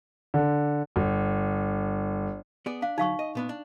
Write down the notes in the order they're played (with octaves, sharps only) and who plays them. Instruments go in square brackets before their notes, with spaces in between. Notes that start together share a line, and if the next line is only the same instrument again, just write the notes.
[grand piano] D3
G1
[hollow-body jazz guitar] B3 G#4 D5
[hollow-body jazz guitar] D4 [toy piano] F5
[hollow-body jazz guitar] D2 A2 F#3 [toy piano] D#4 F5 C#6
[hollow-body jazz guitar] D#5
A#2 B3 D4
D4